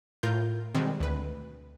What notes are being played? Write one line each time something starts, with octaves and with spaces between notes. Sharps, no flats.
A2 F4 A#4 G6
B2 D#3 G3 G#3 C4
D2 B4